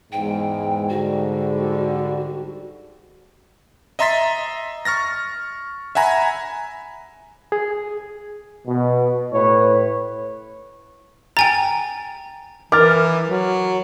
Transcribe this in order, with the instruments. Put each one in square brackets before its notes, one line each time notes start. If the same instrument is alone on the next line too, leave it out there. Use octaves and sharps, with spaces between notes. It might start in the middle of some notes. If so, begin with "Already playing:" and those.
[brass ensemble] E2 G#3 [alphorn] G#2 [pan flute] G5
[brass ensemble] D3 G3 [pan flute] F#4
[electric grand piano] D#5 E5 A#5 C6 A6 B6
C#6 F6 A6 A#6
E5 F#5 G#5 A#5 B5
[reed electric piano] G#4
[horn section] B2
A2 B4 C#5
[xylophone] G5 G#5 A#5 [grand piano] A6
[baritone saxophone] E3 [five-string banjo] A#4 [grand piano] D6 F6 A6
[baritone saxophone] F#3